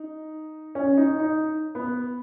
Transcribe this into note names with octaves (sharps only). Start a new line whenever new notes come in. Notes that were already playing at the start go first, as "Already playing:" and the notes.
Already playing: D#4
C#4
D#4
D#4
B3